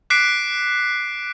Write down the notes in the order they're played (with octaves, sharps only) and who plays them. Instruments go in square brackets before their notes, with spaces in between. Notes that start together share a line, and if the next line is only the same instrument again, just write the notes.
[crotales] D6 F#6 B6 C7 D7